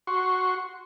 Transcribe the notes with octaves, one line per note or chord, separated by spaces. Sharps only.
F#4 C6 C#6